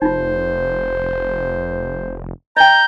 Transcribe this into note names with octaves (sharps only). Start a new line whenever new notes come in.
F1 D#4 F4 C5
D#5 G5 A#5 G6